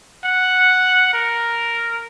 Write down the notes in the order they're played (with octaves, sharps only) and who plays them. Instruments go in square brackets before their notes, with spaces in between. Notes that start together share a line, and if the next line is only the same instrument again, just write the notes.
[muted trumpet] F#5
A#4